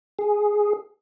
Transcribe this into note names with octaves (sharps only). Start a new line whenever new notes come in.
G#4